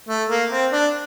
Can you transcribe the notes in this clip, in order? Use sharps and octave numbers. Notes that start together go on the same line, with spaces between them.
A3
A#3
C4
D4